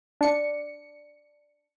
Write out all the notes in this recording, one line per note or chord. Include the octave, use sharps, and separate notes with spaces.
D4 C#7